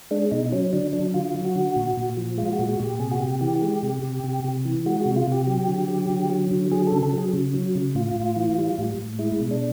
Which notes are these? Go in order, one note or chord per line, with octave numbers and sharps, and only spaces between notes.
G#3 D4
B2 D#4
F#3 C#4
D3 D4
F#3 D4
D3 F4
F#3
F#4
D3
A#2
A#2
F3
G#3 F4
F#4
A#2
F#4
A#2 G4
C3 G#4
F#4
C3 G4
E3 G4
G#3 G4
C3
C3
C3
C3
E3
G#3 F#4
F#4
C3
F4
C3 G4
F#3
D3
F#3
D3
F#3
D3
F#3 G#4
C#3 A4
A4
F#3
G#4
C#3
F#3
C#3
A2 F4
A2
E3
G3
A2
A2
G#3 E4
B2
D4